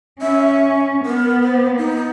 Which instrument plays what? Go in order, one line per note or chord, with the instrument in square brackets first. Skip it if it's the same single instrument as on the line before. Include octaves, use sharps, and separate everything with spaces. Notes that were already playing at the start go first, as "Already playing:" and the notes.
[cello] C#4 [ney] E5
[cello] B3 [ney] A#4
[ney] C5
D#4